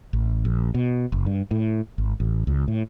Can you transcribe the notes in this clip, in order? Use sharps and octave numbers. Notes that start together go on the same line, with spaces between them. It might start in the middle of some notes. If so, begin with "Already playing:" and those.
A1
A#1
B2
F#1
G2
A2
G#1
A1
C#2
A2